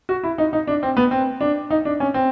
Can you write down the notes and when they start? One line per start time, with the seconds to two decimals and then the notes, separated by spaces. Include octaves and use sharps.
0.09 F#4
0.23 E4
0.38 D#4
0.53 D#4
0.67 D4
0.83 C4
0.97 B3
1.11 C4
1.41 D4
1.71 D#4
1.85 D4
2.00 C#4
2.14 C4